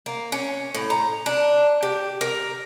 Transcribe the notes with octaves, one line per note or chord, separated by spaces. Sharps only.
A#3
C#4
A2
A#5
D4
G4
A#4